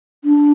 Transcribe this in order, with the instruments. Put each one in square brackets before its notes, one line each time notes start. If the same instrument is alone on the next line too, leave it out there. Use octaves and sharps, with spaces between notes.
[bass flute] D4